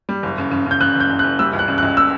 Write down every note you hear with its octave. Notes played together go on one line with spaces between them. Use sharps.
G3
F#1
C#3
C#3
C#3 G6
C#3 F#6
F#1 G6
F#1
F#6
F#1
G3 E6
C#2
F#6
C#3
F#6
C#2
E6